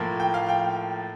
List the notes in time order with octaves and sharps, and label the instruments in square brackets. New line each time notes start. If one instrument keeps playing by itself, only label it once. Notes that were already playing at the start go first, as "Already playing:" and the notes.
Already playing: [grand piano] A2 F3 A#3
G5
F5
G5